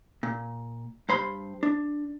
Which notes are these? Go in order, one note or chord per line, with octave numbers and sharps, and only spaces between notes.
A#2
G2 C5 B5 C6
D4